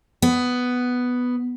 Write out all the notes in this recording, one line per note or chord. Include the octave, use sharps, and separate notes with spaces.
B3